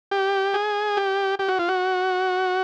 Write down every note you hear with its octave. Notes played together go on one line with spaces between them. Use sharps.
G4
G#4
G4
G4
F#4
F4
F#4